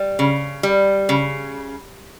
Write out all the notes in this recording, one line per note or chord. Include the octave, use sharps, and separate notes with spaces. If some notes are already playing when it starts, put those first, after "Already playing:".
Already playing: G3
C#3
G3
C#3